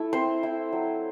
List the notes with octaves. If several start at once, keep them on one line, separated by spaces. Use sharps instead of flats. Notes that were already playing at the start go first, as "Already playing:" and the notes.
Already playing: A3 E4
C4 C5
E4
F#3